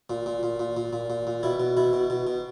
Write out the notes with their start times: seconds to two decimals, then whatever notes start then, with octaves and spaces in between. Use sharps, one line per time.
0.10 A#2
0.26 A#2
0.43 A#2
0.59 A#2
0.77 A#2
0.93 A#2
1.10 A#2
1.27 A#2
1.43 B2 E4
1.60 B2
1.77 B2 E4
1.93 B2
2.10 B2
2.27 B2